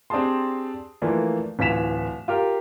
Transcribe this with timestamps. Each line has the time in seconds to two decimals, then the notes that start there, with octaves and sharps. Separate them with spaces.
0.10 C4 D4 G4 G#4 A5 C6
1.02 E3 F3 A3 A#3 D4 F4
1.59 D1 E3 F4 B6 E7 F7
2.28 F4 G4 A#4